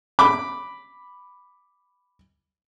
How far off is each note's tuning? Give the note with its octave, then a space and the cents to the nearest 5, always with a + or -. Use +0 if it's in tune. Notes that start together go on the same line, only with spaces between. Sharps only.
B5 +0 D6 +0